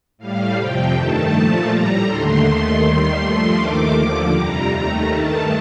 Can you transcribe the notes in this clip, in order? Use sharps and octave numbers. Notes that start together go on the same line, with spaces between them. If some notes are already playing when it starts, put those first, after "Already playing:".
A2 G3 F5
F2 C3 F3 G5
G2 D#3 A3 A5
A#2 F3 A3 A5
A2 G3 A#5
D#2 D3 A3 C6
D#2 D#3 A3 C6
D#2 D#3 G3
G2 F3 A3
D#2 D#3 A3 D6
D#2 D3 F3 D6
F2 C3 G3 A#5
D#2 D#3 A3
G2 D#3 A3 A5